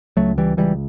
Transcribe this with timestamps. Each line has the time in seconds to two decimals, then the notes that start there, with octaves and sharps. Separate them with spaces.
0.17 C#2 F#3 A3
0.38 E3 G3
0.57 C#2 E3 G3